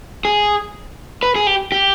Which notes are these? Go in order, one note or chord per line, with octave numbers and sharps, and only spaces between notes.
G#4
B4
G#4
G4
G4